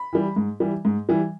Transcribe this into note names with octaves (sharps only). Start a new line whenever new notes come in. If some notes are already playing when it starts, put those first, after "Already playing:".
Already playing: B5
E3 G3
G#2
E3 G3
G#2
E3 G3